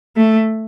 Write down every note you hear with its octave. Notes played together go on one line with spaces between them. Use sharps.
A3